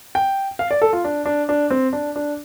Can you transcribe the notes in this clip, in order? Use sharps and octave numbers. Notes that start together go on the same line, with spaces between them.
G5
F5
D5
A4
F4
D4
D4
D4
C4
D4
D4